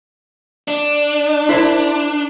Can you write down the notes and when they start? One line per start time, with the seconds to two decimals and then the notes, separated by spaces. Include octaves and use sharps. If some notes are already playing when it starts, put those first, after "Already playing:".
0.68 D4
1.49 E4 A#4 C5